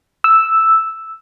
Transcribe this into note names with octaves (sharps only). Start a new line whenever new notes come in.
E6